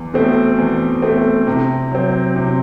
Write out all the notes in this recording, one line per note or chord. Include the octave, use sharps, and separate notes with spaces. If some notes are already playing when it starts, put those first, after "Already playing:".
Already playing: E2
B2 A3 C4
E2
B2 A3 C4
C3
F#3 C4
C3